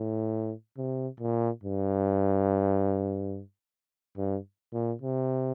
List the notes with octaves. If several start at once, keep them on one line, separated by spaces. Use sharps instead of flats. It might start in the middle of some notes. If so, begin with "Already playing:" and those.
Already playing: A2
C3
A#2
G2
G2
A#2
C3